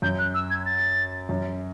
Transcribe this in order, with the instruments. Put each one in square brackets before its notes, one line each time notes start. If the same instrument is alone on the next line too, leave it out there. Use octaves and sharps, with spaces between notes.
[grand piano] F#2 [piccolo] G6
[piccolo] F#6
E6
G#6
A6
[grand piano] F#2